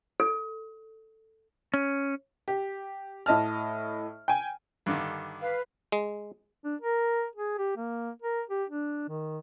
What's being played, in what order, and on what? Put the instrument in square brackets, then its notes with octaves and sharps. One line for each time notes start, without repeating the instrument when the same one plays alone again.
[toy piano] A4
[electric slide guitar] C#4
[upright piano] G4
A2 D#5 A5 F6
G5 G#5
[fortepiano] G2 D3 D#3
[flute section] B4 F5
[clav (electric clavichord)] G#3
[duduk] D4
A#4
G#4
G4
A#3
A#4
G4
D4
D#3